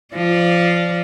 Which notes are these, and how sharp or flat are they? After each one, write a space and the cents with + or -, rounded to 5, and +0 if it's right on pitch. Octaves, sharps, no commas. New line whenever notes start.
F3 -15 D5 +0